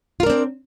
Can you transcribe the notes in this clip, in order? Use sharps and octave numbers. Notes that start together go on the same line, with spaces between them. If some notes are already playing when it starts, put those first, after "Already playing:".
C4 D4 F4 A#4